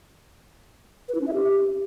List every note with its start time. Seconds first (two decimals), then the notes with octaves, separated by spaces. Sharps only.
1.09 B4
1.15 E4
1.21 C#4
1.27 E5
1.34 G4